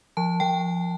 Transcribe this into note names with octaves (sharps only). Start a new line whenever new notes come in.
F3 A5
F3 G5